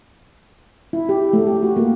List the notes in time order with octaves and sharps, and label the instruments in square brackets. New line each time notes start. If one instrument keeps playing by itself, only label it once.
[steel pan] E4
G4
A3
G4
F#4
A#3